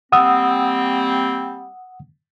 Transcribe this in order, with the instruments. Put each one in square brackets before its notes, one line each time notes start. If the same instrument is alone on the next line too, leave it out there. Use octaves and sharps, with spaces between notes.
[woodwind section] G3 A#3 C4 [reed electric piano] F#5 D#6 E6